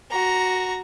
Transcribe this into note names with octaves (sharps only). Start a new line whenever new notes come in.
F#4 A#5